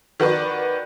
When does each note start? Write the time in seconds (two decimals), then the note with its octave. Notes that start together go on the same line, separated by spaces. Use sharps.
0.20 D#3 F#4 B4 D5